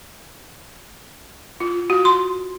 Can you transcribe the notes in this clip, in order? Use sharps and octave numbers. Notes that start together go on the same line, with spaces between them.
F4
F#4
C6